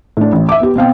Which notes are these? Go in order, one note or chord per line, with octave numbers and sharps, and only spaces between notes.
A2 D4
A1
E5 D6
B3 G4
B2 C4 F5 G5